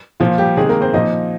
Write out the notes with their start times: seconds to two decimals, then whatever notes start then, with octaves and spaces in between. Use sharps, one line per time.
0.20 A#2 F3 F4
0.38 G3 G4
0.57 C3 D#3 G#3 G#4
0.69 A#3 A#4
0.81 C4 C5
0.93 A#2 F3 D#4 D#5